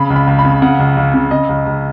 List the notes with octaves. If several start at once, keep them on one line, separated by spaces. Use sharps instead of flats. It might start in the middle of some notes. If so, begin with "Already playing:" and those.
Already playing: C#3 B5
C#2
B5
C#2
B5
C#3
C#3 F#5
C#2
C#2
C#3
C#3 D#5
C#2
C#2